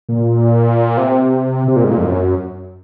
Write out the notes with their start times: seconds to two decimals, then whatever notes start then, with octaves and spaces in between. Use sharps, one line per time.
0.09 A#2
0.97 C3
1.68 C3
1.76 A#2
1.84 G#2
1.92 A#2
1.98 F2
2.04 F#2